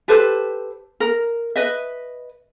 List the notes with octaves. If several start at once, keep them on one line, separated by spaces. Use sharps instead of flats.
G4 A4 B4 C5
A#4
B4 D#5 E5